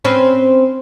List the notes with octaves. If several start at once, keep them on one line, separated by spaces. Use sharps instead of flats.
C4 C#4 B4